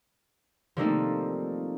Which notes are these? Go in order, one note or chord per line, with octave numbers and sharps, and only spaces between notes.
F3 G3 A3 A#3 C4 D#4